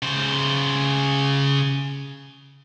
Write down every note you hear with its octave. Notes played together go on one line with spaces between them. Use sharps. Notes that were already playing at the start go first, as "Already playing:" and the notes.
C#3 C5